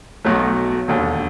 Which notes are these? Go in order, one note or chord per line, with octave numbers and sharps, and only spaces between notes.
B1 B2 F#3 A3
E1 D#2 D3